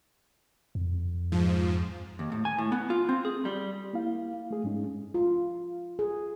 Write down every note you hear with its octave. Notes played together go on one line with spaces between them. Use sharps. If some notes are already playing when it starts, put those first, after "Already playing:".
F2
G#2 F3
D#2
A2
G#5
A2
B3
F4
C4
G#4
G3
A#3 E4 F5
A3 G#4
G#2 G#3 C#4 D#4
F4
G#4